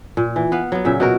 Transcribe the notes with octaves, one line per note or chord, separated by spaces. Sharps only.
A#2
E3
B3 B4 F5
F#3 B3
A#2 C#3 E5
B2 F#4 A#4